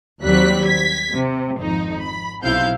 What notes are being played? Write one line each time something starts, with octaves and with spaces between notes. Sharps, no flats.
D#2 F#3 G3 C4 F#6 B6
G#6 B6
C3
G#1 F2 D#4
B5
B1 C3 E4 F5 G6